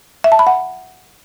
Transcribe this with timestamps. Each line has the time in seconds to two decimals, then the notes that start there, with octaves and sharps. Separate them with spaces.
0.24 E5
0.32 A5
0.39 B5
0.47 F#5